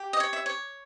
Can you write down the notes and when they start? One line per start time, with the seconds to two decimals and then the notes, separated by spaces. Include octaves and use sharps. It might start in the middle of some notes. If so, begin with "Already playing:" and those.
Already playing: G4
0.13 D#5
0.20 C#5
0.33 E5
0.46 C#5